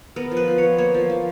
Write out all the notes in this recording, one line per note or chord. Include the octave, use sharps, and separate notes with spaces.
B3 A#4
F3
B4
F3
C#5
B3
A#3 C#5
F3
F3